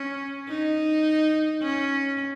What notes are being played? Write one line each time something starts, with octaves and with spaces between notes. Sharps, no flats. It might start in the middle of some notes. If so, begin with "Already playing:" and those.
Already playing: C#4
D#4
C#4